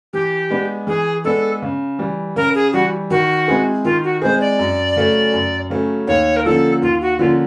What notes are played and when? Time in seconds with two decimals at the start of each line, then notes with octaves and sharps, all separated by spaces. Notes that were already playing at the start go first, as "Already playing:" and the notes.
0.13 E3 G4
0.50 G#3 B3 D4
0.87 E3 G#4
1.24 G#3 B3 D4 A4
1.62 C#3
1.99 E3 G3
2.36 C#3 A#4
2.55 G#4
2.73 E3 G3 F#4
3.10 D#3 F#4
3.48 G#3 C4 E4 G#4
3.85 D#3 F4
4.04 F#4
4.22 G#3 C4 E4 G#4 C5
4.40 D5
4.59 F#2
4.96 C#3 F#3 A3 C#4
5.33 F#2
5.70 C#3 F#3 A3 C#4
6.07 D#2 C#5
6.36 A#4
6.45 D3 F3 A#3 C#4 A4
6.82 D#2 F4
7.01 F#4
7.19 D3 F3 A#3 C#4 F4